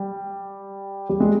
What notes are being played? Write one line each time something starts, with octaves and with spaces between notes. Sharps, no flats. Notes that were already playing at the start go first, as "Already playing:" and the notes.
Already playing: G3
G3
G#3